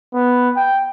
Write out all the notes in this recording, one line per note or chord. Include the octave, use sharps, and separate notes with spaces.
B3
G5